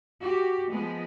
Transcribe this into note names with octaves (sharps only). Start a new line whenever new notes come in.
F#4 G4
F3 G#3 B3